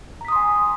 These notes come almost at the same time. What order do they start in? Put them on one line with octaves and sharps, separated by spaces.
A#5 B6 D#6 C6 G#5